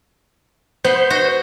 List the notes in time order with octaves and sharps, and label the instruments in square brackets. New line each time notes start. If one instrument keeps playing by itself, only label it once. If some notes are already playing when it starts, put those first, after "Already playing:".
[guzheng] B3 [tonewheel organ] C5
[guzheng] F#4